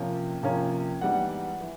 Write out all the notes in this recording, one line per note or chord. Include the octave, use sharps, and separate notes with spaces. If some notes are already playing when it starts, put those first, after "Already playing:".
Already playing: C3 F3 A#3 C#4
C3 F3 A#3 C#4
G#2 E3 G3 B3 D4 F#5
E3